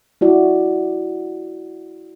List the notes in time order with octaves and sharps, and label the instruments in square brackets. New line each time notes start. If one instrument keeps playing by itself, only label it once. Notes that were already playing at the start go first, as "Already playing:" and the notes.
[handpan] E4 F#4 D5